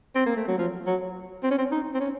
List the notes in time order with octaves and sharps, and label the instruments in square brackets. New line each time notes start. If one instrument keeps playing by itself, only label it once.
[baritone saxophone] C4
A#3
A3
F#3
F3
F#3
C4
C#4
C4
D#4
C4
C#4